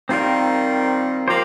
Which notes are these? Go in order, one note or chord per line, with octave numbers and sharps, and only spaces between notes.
D#3 G3 C4 F4 A#4
F3 A#3 G4 C5